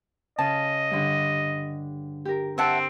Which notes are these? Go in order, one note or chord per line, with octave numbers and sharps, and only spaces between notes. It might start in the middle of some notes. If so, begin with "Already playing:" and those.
C#3 D#5 A5
G2 D3
G4 A#4
C4 E5 F#5 A5